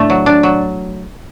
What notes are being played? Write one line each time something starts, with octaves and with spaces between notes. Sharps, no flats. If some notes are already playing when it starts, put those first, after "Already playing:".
Already playing: A2 A3 D4
F#3
D4
F#3